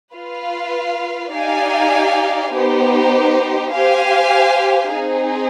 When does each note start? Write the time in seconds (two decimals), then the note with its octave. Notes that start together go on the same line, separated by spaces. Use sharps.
0.13 F4 B4 F5
1.34 D#4 G4 D5 F5 G#5
2.53 B3 D#4 G4 C5
3.74 G4 C5 F5 G#5
4.94 C4 D#4 G#4